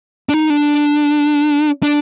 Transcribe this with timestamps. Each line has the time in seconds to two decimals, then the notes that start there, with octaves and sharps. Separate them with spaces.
0.29 D4
0.34 D#4
0.50 D4
1.83 D4